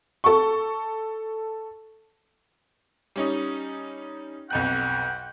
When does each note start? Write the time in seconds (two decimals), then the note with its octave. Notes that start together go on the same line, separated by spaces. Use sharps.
0.24 A4 C#6
3.16 G3 C#4 D#4
4.50 B1 F2 F#5 G5 F#6